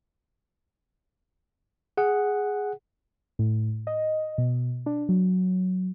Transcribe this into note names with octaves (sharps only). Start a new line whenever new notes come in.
G#4 F#5
A2
D#5
B2
D4
F#3